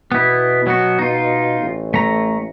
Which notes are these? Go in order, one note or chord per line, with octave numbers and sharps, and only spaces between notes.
B2 B3 E4
F#3 B3 F#4
D#4 F4
A1
A3 A#5